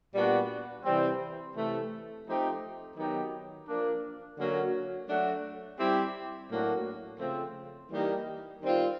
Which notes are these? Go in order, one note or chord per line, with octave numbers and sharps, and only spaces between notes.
A#2 G3 B3 D4 F#4
C3 E3 G3 C4
C3 E3 A3
F3 A3 C4 D#4 G4
D#3 F#3 B3 D#4 G4
F3 A#3 D4
D3 F#3 A#3 C#4 F#4
F#3 A3 D4 F#4
G3 C4 E4 G4
A2 F#3 A#3 D4 F#4
C#3 F3 A3 C4
E3 G3 A#3 D#4 G4
D#3 G3 C4 F4